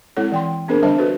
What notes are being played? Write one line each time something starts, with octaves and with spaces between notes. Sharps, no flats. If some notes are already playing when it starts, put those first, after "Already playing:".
G#3 C4 E4 A4 C#5 F#5
E3 G5 C6
B3 C4 D4 G#4 A#4 C5
D3 G3 D4 C5 D#5 A5
F#4 A4 B4